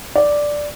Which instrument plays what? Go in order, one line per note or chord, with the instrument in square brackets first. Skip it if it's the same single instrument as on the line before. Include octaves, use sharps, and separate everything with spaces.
[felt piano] D5